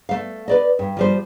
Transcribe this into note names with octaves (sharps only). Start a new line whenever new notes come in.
A3 F5
B4 D5 D#5
G2
F3 G3 C5